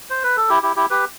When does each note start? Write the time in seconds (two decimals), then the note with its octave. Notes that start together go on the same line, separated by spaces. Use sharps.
0.10 C5
0.23 B4
0.37 A4
0.50 E4 G4
0.63 E4 G4
0.76 E4 G4
0.90 G4 B4